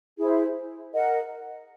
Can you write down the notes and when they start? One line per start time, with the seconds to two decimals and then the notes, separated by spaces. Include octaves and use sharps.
0.17 E4 G#4 C5
0.93 A#4 D#5 F#5